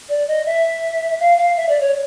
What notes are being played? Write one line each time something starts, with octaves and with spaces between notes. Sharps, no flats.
D5
D#5
E5
F5
F5
E5
D5
C#5